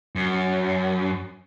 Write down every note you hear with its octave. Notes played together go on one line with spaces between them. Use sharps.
F#2